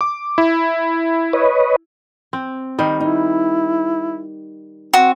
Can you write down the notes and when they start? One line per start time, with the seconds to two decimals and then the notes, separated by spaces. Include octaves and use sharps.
0.01 D6
0.38 E4
1.33 B4 C#5 D#5
2.33 C4
2.79 D#3 G3 D#5
3.00 D#4 E4
4.93 C4 F#4